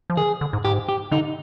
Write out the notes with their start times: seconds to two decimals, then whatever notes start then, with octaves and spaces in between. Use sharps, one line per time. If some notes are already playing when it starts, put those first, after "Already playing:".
0.10 F3
0.17 D#3 G#4
0.41 D3
0.53 G#2
0.65 G#2 G4
0.89 G4
1.11 D3 D#4